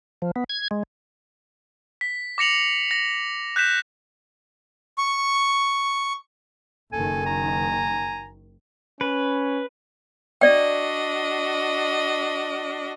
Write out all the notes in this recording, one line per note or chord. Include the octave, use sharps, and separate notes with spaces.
F3
B3
G#6
G#3
B6
D6 A#6 C#7 F7 F#7
A#6
F#6 G6 B6 E7
C#6
F#1 D#3 A4 G#5
A#5
C#4 B4
D4 F#4 D5 D#5 G5